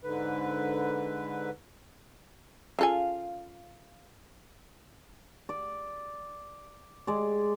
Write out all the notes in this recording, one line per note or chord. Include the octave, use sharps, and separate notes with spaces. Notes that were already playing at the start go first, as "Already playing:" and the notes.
G#2 D3 B4
C#3 F4 A4 F5 G#5
D5
G#3 D5